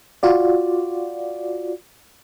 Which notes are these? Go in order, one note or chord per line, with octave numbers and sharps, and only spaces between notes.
F4 F#4 D5